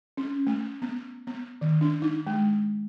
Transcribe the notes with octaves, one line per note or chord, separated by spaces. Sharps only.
C#4
A3
B3
B3
D#3
D4
D#4
G#3